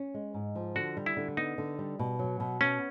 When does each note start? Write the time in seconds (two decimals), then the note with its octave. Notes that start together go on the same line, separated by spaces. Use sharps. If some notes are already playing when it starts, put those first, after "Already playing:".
Already playing: C#4
0.14 G#3
0.34 G#2
0.55 F3
0.75 D3 F#4
0.97 G3
1.06 E4
1.17 D3
1.37 B3 D#4
1.58 D3
1.79 G3
1.99 B2
2.19 F#3
2.40 B2
2.61 B3 C#4